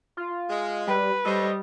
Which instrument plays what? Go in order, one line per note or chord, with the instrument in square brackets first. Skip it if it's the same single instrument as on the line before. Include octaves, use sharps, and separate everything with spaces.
[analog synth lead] F4
[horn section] G#3
[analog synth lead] G3 [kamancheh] B4
[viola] G3 [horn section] A4 C5 C#5 [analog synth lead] D#5